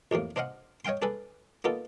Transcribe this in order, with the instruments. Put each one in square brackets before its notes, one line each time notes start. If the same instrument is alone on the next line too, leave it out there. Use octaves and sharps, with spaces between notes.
[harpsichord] A1 F2 A2 A#3
D4 C5 D#5 F5 F#5
C#5 D#5 F5 G5 C6
D4 G#4 A4 B4
A#3 B3 D#4 F4 A4